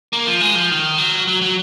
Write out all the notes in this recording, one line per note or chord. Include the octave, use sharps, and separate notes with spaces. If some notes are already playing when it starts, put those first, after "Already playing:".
A#3
F3
G#3
F3
D#3
F#3
F#3
F#3